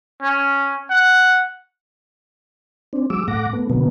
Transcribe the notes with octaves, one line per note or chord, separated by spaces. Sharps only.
C#4
F#5
C4 D4
F#3 G#3 D6 E6
A2 A3 F#5 D6 A#6
A3 B3
B2 D3 F#3 A#3 B3